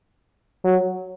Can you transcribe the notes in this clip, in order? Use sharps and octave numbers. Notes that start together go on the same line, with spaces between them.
F#3